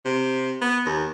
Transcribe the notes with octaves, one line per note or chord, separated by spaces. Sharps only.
C3
B3
D#2